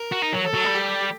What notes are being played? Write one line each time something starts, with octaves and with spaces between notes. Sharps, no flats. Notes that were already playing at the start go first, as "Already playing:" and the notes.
Already playing: A#4
F#4
D#4
F#3
A4
F#3
G3
G4